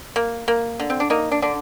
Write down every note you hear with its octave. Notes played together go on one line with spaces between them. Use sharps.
A#3
A#3
D3
C4
D4
A#3 D#4
D4
D3 D4